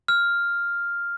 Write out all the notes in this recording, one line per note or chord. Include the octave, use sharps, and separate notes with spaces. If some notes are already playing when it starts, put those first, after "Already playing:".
F6